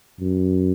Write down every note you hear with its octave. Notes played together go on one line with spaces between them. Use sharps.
F#2